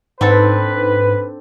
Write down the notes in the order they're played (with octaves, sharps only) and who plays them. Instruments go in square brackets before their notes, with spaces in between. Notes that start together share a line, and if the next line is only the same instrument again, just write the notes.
[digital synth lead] G#2 [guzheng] C4 D4 A4 [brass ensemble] B4